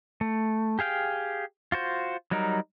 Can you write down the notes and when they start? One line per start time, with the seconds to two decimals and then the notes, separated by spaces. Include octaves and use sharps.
0.21 A3
0.79 G4 G#4 F5 G5
1.72 F4 F#4 C5
2.31 F#3 G3 D#4 A#4